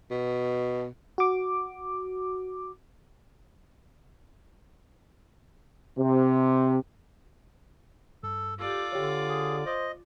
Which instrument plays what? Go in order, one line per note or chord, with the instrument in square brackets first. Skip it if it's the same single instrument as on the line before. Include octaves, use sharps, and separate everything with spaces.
[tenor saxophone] B2
[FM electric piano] F#4 D6
[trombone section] C3
[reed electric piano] G2 [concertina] A4
[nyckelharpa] F4 D5 [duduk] G4 [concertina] A4
[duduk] D3 [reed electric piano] G4 C#5
[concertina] G#4
[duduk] C5 [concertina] D#5